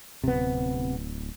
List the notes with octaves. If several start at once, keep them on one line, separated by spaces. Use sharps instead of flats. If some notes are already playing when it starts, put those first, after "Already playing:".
D1 C3 B3